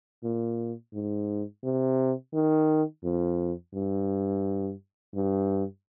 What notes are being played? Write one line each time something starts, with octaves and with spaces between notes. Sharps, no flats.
A#2
G#2
C3
D#3
F2
G2
G2